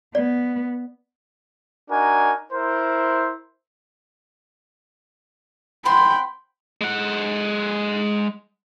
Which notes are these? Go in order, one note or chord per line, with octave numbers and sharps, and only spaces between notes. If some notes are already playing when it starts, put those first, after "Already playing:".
B3 D5
D4 D#4 F#4 A#4 G#5
E4 A#4 C5
C4 F#5 G5 B5 C6
G#3 F#5